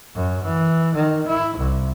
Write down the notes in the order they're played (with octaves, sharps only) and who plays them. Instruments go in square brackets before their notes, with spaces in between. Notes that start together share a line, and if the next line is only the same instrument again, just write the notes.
[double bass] F#2
E3
D#3
E4
C2